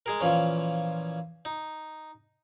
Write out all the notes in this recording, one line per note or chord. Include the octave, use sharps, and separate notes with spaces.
G#3 G#4 A#4
A#2 E3 F3 C#4
D#4